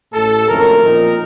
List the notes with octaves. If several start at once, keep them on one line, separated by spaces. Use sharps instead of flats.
A1 A2 A3 A4
F#1 F2 D#3 A3 C#4 A#4
A#2 F3 C4 D#4